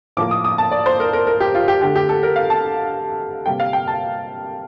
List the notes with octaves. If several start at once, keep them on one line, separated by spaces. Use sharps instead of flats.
A2 F3 A#3 D6
D#6
D#6
A5
D5
C5
A#4
A#4
A#4
G4
F4
G4
D3 A3 G4
G4
A4
A#4
F5
A5
C3 G3 A#3 G5
F5
G5
A5